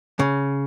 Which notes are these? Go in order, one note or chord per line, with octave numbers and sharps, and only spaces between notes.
C#3